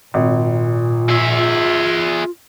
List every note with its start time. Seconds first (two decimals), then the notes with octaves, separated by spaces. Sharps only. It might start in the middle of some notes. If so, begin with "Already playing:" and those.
0.14 G#1 A#2
1.10 F4 G#4 E5